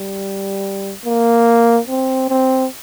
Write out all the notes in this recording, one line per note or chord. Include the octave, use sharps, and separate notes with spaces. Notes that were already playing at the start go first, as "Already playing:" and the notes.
Already playing: G3
A#3
C4
C4